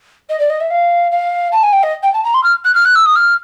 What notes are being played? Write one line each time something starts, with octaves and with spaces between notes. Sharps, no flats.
D#5
D5
D#5
E5
F5
F5
A5
G#5
G5
D#5
G5
A5
A#5
C6
F6
F#6
F6
F#6
E6
D#6
F6